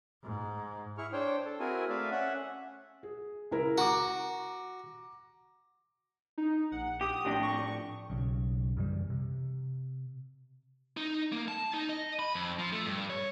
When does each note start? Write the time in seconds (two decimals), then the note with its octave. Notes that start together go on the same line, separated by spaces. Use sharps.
0.24 G#2
0.98 E4 G#4 C#6 F6
1.13 D4 C5 C#5 G5
1.45 A4
1.60 C4 E4 F#4 G#4 A#4 G#5
1.89 A3 D5 E5 F5
2.11 C#4 E5 F#5
3.03 G#4
3.51 C#2 E4 A#4
3.78 F#4 A#5 D6
6.38 D#4
6.72 A#1 F#5
7.01 G4 D#6
7.25 F2 A2 D4 G5
7.43 C#6
8.10 B1 C#3
8.77 F#2 C#3 E3 G3
9.10 C3
10.97 D#4
11.32 A#3
11.48 A5
11.74 D#4
11.89 D#5
12.19 B5
12.35 F2
12.59 F3
12.72 A3
12.86 G2
13.10 C#5